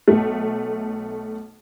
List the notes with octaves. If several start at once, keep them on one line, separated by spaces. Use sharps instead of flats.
B1 A3